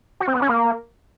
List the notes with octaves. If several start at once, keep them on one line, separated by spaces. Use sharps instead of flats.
F#4
C4
B3
C#4
A#3